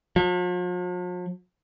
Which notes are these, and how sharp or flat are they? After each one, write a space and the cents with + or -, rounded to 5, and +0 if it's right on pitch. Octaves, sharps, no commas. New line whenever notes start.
F3 +45